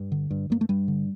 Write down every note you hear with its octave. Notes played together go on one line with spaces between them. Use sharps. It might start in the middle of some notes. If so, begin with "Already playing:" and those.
Already playing: G2
D3
G2
G2 A#3
A3
G2 G3
D3